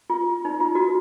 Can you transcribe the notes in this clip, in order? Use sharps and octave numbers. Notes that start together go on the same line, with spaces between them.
F4
D#4
F4
F#4